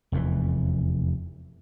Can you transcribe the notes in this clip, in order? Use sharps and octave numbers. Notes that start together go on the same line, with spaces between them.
F1 E2 A2 E3